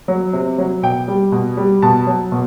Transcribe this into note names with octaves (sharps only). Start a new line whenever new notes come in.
F#3
C3
F#3
B2 G5
G3
B2
G3
B2 A5
F#3
B2